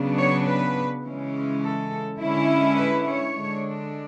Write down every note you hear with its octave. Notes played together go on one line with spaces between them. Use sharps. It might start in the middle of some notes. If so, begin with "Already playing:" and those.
Already playing: C#3 F#3 B3 D4
C#5
B4
C#3 E3 G#3 C#4
A4
D3 G#3 C#4 E4
B4
C#5
D3 G#3 D4